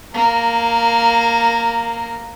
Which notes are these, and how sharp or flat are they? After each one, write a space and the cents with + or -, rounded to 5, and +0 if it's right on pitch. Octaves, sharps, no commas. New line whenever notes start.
A#3 +0 A#4 -20